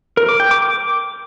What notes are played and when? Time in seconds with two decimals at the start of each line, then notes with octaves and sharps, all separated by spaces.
0.17 A#4
0.29 D6
0.40 G5
0.51 D6
0.62 D6